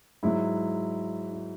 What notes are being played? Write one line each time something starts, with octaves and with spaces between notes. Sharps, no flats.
G#2 F#3 E4
E4